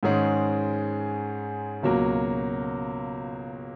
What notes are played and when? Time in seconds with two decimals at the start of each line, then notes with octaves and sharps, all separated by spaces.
0.03 G#2 D#3 G#3 C#4 G#4
1.83 C#2 B2 F#3 A#3